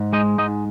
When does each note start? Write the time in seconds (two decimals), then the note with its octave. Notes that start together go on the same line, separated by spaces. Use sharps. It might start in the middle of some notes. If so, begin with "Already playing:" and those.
Already playing: G#2
0.13 G#3 D#4 D#5
0.38 G#2 D#4 D#5